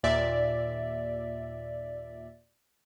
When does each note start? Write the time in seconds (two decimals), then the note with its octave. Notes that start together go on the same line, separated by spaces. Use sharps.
0.03 D#2 A#2 D5 E5